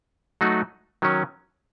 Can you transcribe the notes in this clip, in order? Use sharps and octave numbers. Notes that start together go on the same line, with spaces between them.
F#3 A3 D#4 F#4
D#3 F#3 C#4